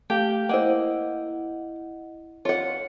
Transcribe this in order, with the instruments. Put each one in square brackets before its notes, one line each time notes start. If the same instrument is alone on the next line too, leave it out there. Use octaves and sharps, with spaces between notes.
[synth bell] A3 F5 G5 [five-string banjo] G4
[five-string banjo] A#3 C5 [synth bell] E4 D#5 F#5
[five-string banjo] F4 F#5 [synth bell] C#5